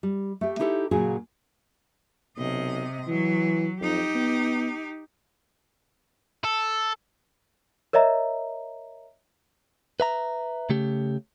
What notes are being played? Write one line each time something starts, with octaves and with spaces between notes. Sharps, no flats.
G3
A3 G4
D#4 E4 G4 A4 C5
A#2 C#3 F#3 F#4 G#4
B1 C3 D#5
E3 F#3
F2 D#4 G4
B3
A4
A#4 C#5 D#5 E5 A#5
B4 E5 A#5
C#3 A3 G4